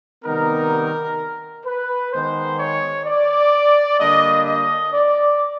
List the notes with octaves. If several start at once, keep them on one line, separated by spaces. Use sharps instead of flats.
C3 D#3 G3 B3 D#4 A#4
B4
D#3 G#3 B3 C5
C#5
D5
D3 G3 A#3 D4 D#5
D#5
D5